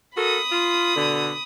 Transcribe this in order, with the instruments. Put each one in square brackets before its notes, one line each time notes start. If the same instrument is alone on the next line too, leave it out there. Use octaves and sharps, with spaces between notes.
[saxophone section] F#4 A4 A#4 [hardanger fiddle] B5 D#6
[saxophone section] F4
B2 D3